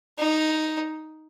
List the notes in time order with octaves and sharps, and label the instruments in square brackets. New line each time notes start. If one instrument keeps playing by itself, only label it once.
[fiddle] D#4